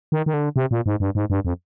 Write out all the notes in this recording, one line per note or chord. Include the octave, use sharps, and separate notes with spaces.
D#3
D#3
D3
C3
A#2
G#2
G2
G#2
G2
F2